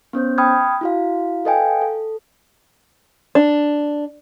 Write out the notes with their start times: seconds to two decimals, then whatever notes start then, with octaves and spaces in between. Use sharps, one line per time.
0.13 B3 C#4 C5 G6
0.38 G5 B5 D#6 F6 G#6
0.81 E4 F#4 F5
1.45 A4 B4 D#5 F5 G5 G#5
1.82 A4
3.35 D4